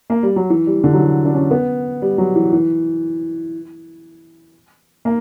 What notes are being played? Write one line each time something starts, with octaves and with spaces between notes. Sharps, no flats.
A#3
G3
F#3
E3
G3
D3
F#3
E3
D4
C#4
B3
G3
F#3
E3
E3
A#3